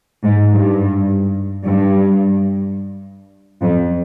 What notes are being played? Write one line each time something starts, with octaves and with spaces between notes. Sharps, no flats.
G#2
G2
G2
F2